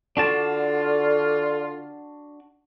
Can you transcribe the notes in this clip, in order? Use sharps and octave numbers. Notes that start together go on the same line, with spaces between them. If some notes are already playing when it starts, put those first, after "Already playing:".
D3 D4 F4 F#4 A5